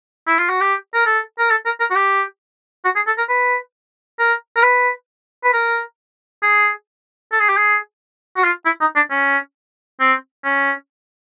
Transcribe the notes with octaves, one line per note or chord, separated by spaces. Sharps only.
E4
F4
F#4
G4
A#4
A4
A#4
A4
A#4
A#4
F#4
G4
F#4
G#4
A4
A#4
B4
A#4
A#4
B4
B4
A#4
G#4
A4
G#4
G4
G#4
F#4
F4
E4
D#4
D4
C#4
C4
C#4